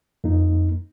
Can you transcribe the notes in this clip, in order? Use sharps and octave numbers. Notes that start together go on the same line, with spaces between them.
F2 A#3 D#4